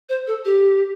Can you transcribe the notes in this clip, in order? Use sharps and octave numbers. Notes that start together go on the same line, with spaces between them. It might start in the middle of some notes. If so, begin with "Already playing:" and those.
C5
A4
G4